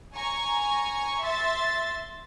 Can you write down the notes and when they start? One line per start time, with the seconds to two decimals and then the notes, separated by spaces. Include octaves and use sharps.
0.15 G#5 A#5 C#6
1.22 E5 C6 A6